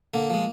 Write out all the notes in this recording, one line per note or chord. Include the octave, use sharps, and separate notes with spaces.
D3 A#3
F3 G#3